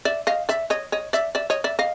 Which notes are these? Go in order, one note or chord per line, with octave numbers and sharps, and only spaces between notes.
D5 E5
D#5 F5
D5 E5
C#5 D#5
C#5 D#5
D5 E5
D5 E5
C#5 D#5
D5 E5
D#5 F5